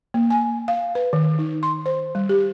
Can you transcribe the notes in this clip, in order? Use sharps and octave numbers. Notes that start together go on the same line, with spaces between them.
A#3
G#5
F5
B4
D#3
D#4
C6
C5
G3
G4